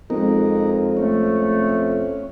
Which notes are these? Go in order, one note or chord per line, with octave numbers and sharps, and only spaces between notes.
F2 G#3 C4 D#4 A#4
A3 C#4